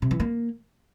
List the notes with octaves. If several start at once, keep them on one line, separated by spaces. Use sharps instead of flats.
C3
E3
A#3